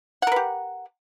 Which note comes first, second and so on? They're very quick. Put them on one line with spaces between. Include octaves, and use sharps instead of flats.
F#5 A#4 B4 G4